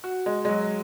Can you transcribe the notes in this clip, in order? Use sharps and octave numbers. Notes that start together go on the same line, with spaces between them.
F#4
G#3
G#3
F#3